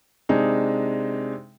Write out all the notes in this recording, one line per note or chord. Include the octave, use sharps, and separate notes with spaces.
C3 G#3 D4 D#4